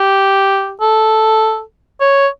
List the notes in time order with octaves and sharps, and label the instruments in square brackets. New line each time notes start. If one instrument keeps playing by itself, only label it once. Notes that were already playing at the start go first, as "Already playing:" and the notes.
Already playing: [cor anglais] G4
A4
C#5